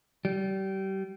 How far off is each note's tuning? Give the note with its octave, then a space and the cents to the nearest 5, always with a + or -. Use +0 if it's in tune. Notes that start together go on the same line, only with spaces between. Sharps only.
G3 -30